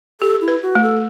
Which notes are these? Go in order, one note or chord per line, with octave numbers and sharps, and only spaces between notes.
G4 A4
E4
B4
F#4
A3
A4